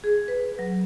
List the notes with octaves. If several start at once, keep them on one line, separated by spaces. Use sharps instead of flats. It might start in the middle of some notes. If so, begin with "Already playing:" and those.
G#4
B4
F#3